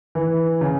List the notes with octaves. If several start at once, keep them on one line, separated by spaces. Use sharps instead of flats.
E3
C#3